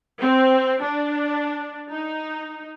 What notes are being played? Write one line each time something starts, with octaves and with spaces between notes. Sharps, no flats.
C4
D4
D#4